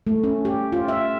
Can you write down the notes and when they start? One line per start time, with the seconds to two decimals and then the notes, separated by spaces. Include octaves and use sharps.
0.07 A3
0.23 C#4
0.45 G4
0.72 F4
0.88 E5